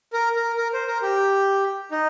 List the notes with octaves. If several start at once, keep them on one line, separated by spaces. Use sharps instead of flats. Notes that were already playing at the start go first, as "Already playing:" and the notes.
A#4
A#4
A#4
C5
A#4
G4
D#4